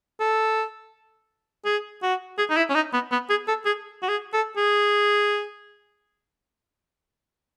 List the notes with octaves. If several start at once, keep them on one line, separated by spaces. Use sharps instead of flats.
A4
G#4
F#4
G#4
D#4
E4
C#4
D#4
B3
B3
G#4
A4
G#4
F#4
G#4
A4
G#4